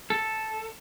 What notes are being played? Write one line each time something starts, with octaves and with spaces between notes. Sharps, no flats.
A4